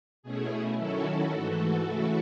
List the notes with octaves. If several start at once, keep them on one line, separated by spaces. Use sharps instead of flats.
B2 A3 C#4 E4 G#4
D#3 F#3 C#4 E4 F#4 A4
G#2 E3 A3
C#3 E3 A3 E4